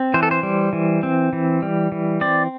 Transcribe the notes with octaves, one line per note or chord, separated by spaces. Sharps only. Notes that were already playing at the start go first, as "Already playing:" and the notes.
Already playing: C4
E3 C5
A4
C5
G3
E3
C4
E3
G3
E3
C4 D5